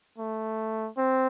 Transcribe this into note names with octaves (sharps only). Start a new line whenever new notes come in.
A3
C4